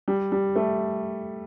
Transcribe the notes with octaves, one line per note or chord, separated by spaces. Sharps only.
G3
G3
A3